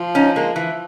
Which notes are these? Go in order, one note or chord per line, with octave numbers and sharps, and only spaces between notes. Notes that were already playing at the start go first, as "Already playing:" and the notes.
Already playing: F3
C#4 D#4
G#3 A#3
E3